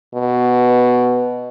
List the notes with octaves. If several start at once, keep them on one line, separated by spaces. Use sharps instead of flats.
B2